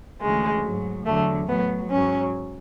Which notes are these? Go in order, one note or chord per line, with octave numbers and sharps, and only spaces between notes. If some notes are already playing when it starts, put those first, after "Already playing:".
D2 C#3 E3 G#3
G#2 F#3
E2 D3 F#3 A3
A2 F#3 B3
G#2 F#3 C#4